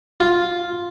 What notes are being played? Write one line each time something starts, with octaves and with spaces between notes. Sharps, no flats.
F4